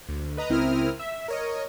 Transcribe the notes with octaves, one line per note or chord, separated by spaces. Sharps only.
D2
B4 D#5 A#5 D#6
C#2 C4 E4 A#4 D#6 F6
E5
A#4 C#5 D#5